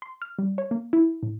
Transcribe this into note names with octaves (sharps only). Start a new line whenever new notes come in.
C6
F6
G3
C#5
A#3
E4
A2